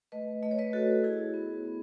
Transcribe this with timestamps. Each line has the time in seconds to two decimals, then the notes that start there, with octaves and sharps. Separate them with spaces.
0.12 A3 B4 D#5
0.43 A3 D#5
0.51 C#5
0.59 B4 D#5
0.73 F#4 A4
1.03 E4 G#4
1.34 B3
1.65 B3